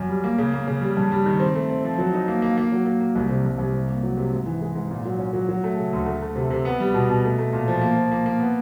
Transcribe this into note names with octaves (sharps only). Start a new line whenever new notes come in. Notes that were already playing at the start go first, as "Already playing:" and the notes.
Already playing: F#2
G3
A#3
C#3
A#3
C#3
G3
G2
G3
D#3
C4
A3
C4
F3
F#3
D#4
A#3
A#3
A#3
F#3
A#3
A#3
C2
C3
C2
C2
C3
A#3
F#3
C3
G#2
E3
G#3
G#2
A#2
F#3
C#4
F#3
F#3
A3
C#3
D2
A3
A3
C3
C3
B3
G3
B2
B2
A3
A3
A#2
F3
A#3
F3
A#3
A#3
B3